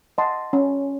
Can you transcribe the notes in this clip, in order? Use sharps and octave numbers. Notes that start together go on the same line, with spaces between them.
D#5 F#5 A5 C6
C#4